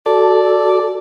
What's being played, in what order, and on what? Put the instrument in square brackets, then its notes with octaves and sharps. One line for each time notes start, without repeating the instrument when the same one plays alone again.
[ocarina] F#4 [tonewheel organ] A4 [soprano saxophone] D5